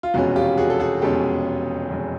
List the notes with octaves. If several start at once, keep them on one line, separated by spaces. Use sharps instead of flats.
F4
F1 E2 B2 G#3 C#4 F#4
F4 G4
F#4 G#4
A4
F#4 G#4
F1 E2 B2 G#3 C#4 G4 A4
F1 E2 B2 G#3 C#4